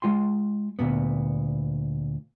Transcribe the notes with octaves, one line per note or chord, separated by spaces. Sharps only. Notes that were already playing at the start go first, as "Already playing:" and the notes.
G#3 F4 G#5 C6
D2 G2 A#2 B3